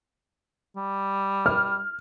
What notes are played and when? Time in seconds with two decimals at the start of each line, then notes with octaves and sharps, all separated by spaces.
0.76 G3
1.46 F6